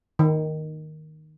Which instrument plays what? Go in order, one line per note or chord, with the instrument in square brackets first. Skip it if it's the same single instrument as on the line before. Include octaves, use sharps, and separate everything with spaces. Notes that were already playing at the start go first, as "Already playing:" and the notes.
[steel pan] D#3